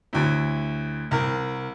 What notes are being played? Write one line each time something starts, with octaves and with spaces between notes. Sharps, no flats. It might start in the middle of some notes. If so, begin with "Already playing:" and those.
D2 A2
C2 A#4